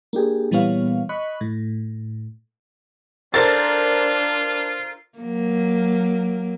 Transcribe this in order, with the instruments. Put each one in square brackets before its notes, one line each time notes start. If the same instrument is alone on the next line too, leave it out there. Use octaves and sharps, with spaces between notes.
[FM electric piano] A#3 D4 G4 G#4
A#2 E3 G3 B3 C#5 F5
D#5 B5 C#6 F#6
A2
[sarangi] D4 [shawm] F4 [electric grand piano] A4 A#4 C5 [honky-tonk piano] A6
[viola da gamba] F#3 A#3